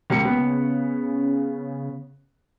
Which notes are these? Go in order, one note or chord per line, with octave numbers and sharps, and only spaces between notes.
C#2 A#3 C#7
C#3 B3